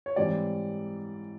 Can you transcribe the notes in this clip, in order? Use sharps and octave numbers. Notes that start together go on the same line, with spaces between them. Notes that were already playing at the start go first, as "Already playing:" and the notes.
C#5
G#2 E3 G3 C4 D5